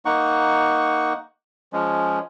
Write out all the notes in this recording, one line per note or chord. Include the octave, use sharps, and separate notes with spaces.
A#3 D#4 F#5 C#6
F3 G#3 C#4